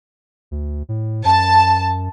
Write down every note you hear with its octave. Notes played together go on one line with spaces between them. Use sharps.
D2
A2
F#2 A5